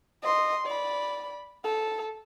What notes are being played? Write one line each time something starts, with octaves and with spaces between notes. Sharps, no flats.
D#5 C6
D5 B5
A4